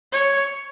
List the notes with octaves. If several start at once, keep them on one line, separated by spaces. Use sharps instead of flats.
C#5